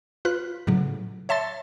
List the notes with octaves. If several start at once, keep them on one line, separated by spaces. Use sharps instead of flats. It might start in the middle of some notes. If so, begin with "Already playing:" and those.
F4 B4 F#6
A2 C#3 F#3
C#5 E5 A5 C6 A6